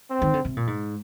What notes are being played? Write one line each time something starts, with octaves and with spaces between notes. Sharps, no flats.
C4
D#3
D3
C3
A#2
G#2